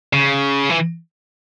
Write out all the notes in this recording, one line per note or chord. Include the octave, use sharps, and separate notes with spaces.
C#3
E3